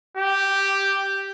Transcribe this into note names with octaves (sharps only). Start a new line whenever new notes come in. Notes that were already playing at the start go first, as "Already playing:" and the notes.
G4